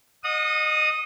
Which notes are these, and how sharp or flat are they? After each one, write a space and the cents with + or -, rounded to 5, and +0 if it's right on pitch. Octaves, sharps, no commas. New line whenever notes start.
D#5 -25 F#5 -40 D#6 +0